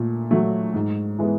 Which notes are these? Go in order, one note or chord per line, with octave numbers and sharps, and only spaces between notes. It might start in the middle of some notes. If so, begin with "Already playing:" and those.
Already playing: A#2 A3
F#3 A3
G#2
E3 G#3 B3